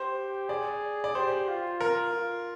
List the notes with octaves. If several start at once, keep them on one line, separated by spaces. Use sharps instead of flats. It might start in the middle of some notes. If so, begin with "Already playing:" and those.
Already playing: G4 C5
G#4 D5
D5
G4 C5
F4
A#4
F4